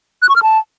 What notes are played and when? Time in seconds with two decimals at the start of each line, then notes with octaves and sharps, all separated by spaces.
0.22 F#6
0.29 C#6
0.36 F6
0.43 A5